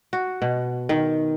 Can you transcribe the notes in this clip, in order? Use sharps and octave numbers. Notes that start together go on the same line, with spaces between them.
F#4
B2
D#3